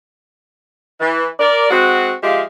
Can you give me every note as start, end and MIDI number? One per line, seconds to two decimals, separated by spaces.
1.00 1.26 52
1.39 1.69 70
1.39 1.69 74
1.70 2.12 56
1.70 2.12 60
1.70 2.12 66
2.23 2.42 53
2.23 2.42 56
2.23 2.42 67
2.23 2.42 76
2.23 2.42 77